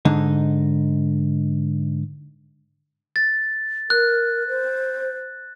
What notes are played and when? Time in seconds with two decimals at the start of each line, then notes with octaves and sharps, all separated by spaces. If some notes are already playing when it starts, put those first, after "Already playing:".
0.05 G#2 D3 D#4
3.16 A6
3.90 A#4 F#6
4.48 C5